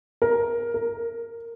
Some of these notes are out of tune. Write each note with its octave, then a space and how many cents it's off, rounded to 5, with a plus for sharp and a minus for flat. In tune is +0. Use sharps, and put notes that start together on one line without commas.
A#4 +10
A#4 -15